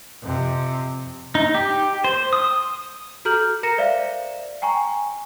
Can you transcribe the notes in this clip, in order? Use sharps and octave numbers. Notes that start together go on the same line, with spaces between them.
F2 C3
D#4
G4
C5
D#6
F#4 A4 A#5 F6 G6 F#7
A#4 A#5 A#6 C#7 E7
C5 D5 E5 F5
G5 G#5 A#5 C#6